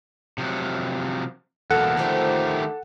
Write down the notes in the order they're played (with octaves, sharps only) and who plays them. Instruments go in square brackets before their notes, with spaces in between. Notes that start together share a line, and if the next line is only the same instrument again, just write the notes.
[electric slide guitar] C3 F3 F#3
[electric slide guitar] E2 B2 A#3 [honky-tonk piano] A4 [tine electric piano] F#5
[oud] D2 F3 [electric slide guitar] D#3 A3 G4